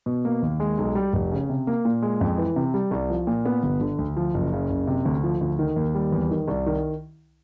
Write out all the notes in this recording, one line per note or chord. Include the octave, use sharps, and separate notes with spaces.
B2
A#3
D#2
G#3
B1
G3
F1
C#3
C3
A#3
A#2
G#3
F2
E3
C3
G3
C2
F3
A#2
B3
G1
D3
D2
F3
F#1
C#3
F#1
C3
D2
F3
D2
D#3
D#2
G3
E2
D#3
C2
D#3